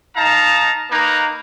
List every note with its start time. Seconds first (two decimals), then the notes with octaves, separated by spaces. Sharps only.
0.17 D#4 F5 A5 A#5
0.91 A#3 D#4 B4 A#5